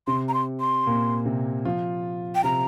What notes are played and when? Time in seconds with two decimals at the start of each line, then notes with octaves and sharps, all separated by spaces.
0.07 C3 C4 C6
0.29 A#5
0.34 C6
0.60 C6
0.86 A#2 A#3
1.25 C3 C4
1.65 F3 F4
2.35 G5
2.44 C3 C4 A#5